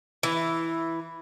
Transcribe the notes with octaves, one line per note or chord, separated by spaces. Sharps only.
E3